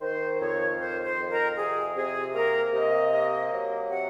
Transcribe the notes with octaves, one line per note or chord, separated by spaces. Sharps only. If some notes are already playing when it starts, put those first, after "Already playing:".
D#3 C5
C5
F2 C#5
D#3 C5
C5
F2
A#4
C3 G#4
C3 G#4
A#3 A#4
C3 D#5
A#3
F#3
C3 F#5